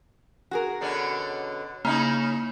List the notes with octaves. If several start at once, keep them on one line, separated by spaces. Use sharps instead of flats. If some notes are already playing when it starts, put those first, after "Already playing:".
F#4 G#4 A#4
B2 D3 C#4
C#3 A#3 C#4 D#4 E4